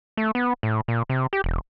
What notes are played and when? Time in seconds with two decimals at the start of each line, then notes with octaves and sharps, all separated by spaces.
0.17 A3
0.35 B3
0.63 A2
0.88 A#2
1.09 C3
1.33 G4
1.44 E1